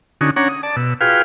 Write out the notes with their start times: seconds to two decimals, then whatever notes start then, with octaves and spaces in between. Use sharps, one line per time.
0.21 D3 C#4 D#4 F#4
0.36 C#4 D4 C#5 F#5 A#5
0.49 D#6
0.63 D5 A5
0.76 B2 E6
1.01 F4 F#4 G#4 B4 F5 G5